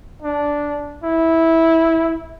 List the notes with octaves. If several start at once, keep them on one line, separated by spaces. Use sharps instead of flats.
D4
E4